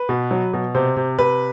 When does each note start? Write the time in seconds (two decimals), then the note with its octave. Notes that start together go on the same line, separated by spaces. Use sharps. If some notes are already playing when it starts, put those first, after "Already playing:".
Already playing: B4
0.09 B2
0.31 F#3
0.53 B2
0.75 C3 C5
0.97 C3
1.19 C3 B4